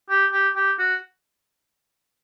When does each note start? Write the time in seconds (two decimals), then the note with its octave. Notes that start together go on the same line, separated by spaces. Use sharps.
0.10 G4
0.33 G4
0.56 G4
0.79 F#4